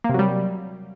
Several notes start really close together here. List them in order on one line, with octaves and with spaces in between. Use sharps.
A#3 C3 F#3 G3